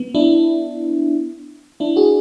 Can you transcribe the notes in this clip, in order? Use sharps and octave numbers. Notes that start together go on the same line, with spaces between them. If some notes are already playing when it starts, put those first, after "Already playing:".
Already playing: B3
D4 E4
D4 E4
F#4 G#4